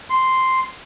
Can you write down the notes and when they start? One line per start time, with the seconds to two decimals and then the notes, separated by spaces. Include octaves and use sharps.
0.10 C6